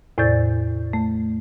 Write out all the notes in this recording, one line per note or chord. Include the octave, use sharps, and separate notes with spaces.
E2 A2 C3 D5 G6 A6
A3